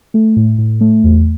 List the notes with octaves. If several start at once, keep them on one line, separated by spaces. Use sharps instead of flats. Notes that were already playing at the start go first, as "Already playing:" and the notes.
A3
A2
A2
A3
E2